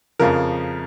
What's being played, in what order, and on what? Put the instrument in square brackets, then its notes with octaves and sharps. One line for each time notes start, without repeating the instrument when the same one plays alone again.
[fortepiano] F2 C#3 F3 A#4